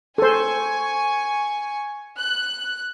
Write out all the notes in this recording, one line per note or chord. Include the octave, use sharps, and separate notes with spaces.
A4 C5 G#5 C#6
F#6